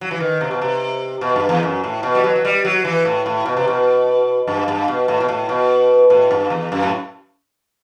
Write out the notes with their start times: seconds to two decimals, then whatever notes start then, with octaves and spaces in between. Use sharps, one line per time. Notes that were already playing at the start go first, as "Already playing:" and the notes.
0.01 F#3
0.11 E3
0.20 D#3
0.41 C3
0.51 B2
0.62 C3
1.21 B2
1.36 G2
1.49 E2
1.63 F#2
1.84 A2
2.03 B2
2.15 G3
2.24 F#3
2.35 F#3
2.45 G3
2.65 F#3
2.84 E3
3.05 A2
3.26 A2
3.45 B2
3.57 C3
3.68 B2
4.47 G2
4.68 G2
4.88 B2
5.08 A2
5.20 B2
5.28 A2
5.49 B2
6.10 A2
6.31 G2
6.50 E2
6.72 F#2
6.83 A2